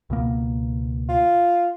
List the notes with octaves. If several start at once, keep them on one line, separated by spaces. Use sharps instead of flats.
C#2 B2 A#3
F4